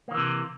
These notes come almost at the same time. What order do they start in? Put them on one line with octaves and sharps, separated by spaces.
A#3 D#3 E3 C3